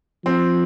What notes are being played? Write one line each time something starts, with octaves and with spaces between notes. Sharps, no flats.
F3 C4